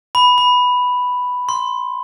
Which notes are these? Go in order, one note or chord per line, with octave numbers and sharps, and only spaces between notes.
B5
B5
C6